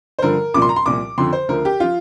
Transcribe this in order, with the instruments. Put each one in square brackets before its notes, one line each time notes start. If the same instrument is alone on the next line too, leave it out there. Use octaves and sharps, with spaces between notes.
[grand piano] C5
G2 D3 F3 A#4
C2 A#2 F3 D6
C6
A#5
C6
C2 A#2 F3 D6
F2 D3 F3 C6
C5
D2 D3 F3 A#4
G4
F3 F4